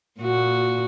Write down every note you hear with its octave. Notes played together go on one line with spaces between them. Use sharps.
A#2 F#4